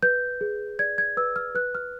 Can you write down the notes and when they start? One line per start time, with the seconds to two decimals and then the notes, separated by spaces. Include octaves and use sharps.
0.03 B4 G6
0.41 G#4
0.79 D5 G#6
0.98 G#6
1.17 B4 E6
1.36 F6
1.55 B4 F#6
1.75 F6